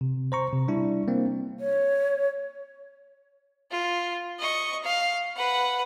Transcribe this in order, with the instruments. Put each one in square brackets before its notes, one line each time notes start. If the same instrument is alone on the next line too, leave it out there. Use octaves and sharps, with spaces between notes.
[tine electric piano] C3
C5 A#5 C#6
C3
G3 D4 E4
A#3 C4
[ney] C#5
[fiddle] F4
D#5 C#6
F5
B4 F#5